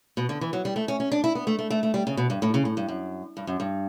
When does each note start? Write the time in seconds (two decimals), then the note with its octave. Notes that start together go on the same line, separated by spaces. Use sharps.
0.17 B2
0.29 D3
0.41 E3
0.53 F#3
0.65 G3
0.76 A3
0.88 C#4
1.00 C#4
1.12 D4
1.24 E4
1.35 B3
1.47 A3
1.59 A3
1.70 A3
1.83 A3
1.94 G3
2.07 C#3
2.17 B2
2.30 G2
2.42 A2
2.54 C#3
2.65 A2
2.77 G2
2.88 F#2
3.37 G2
3.47 F#2
3.60 G2